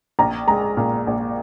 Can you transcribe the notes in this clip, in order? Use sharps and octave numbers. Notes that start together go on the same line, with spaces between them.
A#1 A#5
G#3 A#5
A#2
A#1